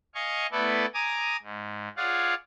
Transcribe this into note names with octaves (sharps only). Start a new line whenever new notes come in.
D#5 F5 G#5 C#6
A3 B3 E4 A4 B4 D5
G#5 A#5 D6 D#6
G#2
F4 G#4 C#5 D5 F5 F#5